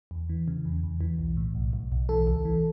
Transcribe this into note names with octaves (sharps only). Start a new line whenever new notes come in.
E2
E3
C#3
E2
E2
E3
B1
A2
B1
B1
B1
E3 A4
C#2
E3